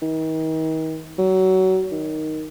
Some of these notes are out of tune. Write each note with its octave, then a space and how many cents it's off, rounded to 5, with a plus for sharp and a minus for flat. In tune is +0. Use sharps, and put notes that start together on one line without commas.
D#3 +40
F#3 +25
D#3 +0